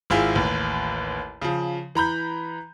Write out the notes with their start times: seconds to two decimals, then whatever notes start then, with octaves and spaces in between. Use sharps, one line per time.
0.10 G#1 E4 F4 G#4
0.35 A1 D#2
1.42 C#3 F3
1.95 E3 A#5 B5 G6